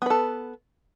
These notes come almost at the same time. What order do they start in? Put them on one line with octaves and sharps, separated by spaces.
B3 B4 A4